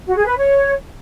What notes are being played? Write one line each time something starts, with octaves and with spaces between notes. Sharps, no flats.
F#4
G#4
B4
C#5